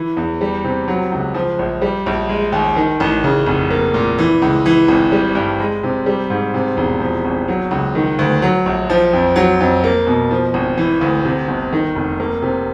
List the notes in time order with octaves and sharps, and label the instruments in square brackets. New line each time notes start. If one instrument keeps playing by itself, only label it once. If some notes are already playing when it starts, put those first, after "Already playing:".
Already playing: [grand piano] E3
E2
G3
C3
F#3
C#2
F3
A#1
G3
A#1
G#3
D#2
D#3
A1
C#3
F1
A#3
A#2
E3
C#2
E3
G#1
G3
G2
G#3
C3
G3
G#2
C3
E1
F3
G#1
F#3
C#2
D#3
D2
F#3
A#1
F3
F2
F#3
F2
A#3
B2
F3
G#1
E3
D2
C3
G1
D#3
F1
A#3
C3